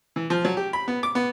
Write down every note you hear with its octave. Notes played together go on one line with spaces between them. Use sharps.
E3
F3
F#3
G4
B5
B3
D6
B3